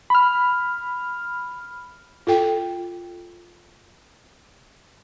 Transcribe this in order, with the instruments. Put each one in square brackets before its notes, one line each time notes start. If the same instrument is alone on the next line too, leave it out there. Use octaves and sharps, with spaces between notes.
[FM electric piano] B5 F6
[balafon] F4 A4 G5